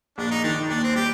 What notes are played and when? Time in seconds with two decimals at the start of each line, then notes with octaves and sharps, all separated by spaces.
0.18 A#1 D4
0.31 D#4
0.44 D#3 D4
0.70 D#2 D4
0.83 C4
0.95 G3 G4